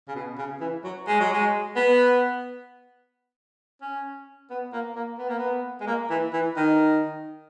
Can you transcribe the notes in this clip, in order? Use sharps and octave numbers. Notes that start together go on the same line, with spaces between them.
C#3
B2
C#3
E3
F#3
G#3
F#3
G#3
B3
C#4
B3
A#3
A#3
B3
A#3
B3
G#3
A#3
E3
E3
D#3